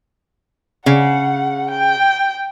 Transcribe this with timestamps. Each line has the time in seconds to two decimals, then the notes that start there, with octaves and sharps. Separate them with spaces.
0.86 C#3 F#5
1.70 G5